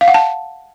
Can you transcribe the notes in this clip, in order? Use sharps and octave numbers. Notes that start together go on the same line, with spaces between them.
F5
F#5
A5